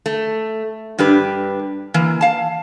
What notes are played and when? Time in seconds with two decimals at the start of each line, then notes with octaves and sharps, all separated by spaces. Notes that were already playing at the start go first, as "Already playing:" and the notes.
0.06 A3
0.98 G2 D4 G4 B4
1.94 E3 A#3
2.21 F5 A5